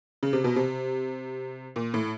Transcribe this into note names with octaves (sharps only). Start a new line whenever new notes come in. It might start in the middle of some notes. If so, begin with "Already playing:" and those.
C#3
C3
B2
C3
A#2
A2